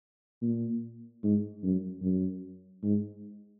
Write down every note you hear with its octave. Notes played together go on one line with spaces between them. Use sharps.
A#2
G#2
F#2
F#2
G#2